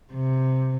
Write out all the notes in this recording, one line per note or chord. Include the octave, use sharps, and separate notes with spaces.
C3